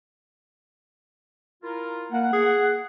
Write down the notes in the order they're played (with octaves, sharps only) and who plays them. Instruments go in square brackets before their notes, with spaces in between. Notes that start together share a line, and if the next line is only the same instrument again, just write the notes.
[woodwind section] E4 F4 A#4
[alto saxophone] A#3 [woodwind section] F#5
[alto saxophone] G#4